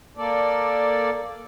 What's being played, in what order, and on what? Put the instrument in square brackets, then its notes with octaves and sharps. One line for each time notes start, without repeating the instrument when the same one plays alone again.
[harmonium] A#3 A4 D5